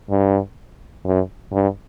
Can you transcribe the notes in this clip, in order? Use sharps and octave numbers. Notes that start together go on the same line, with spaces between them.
G2
F#2
G2